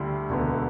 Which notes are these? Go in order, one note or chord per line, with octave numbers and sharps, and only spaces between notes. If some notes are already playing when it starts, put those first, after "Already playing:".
Already playing: D2 D3 G3 E4
E1 D2 D3 B3